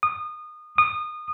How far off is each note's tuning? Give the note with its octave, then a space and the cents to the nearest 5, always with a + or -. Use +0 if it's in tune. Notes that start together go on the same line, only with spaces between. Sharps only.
D#6 -25
D#6 -25